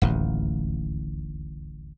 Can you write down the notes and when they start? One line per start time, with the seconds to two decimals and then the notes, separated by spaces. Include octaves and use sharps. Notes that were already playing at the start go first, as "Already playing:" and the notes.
0.02 D1 A1 D#2